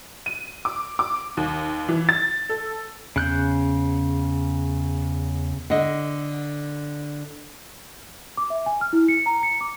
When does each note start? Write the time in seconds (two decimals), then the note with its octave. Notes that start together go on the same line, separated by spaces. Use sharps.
0.26 D#7
0.65 D6
0.99 D6
1.37 D#2
1.89 E3
2.09 A6
2.49 A4
3.16 E2 C#3 F#6 G6
5.70 D3 D#5
8.37 D6
8.50 E5
8.66 G#5
8.81 F6
8.93 E4
9.08 C#7
9.26 A#5
9.43 C#7
9.61 D6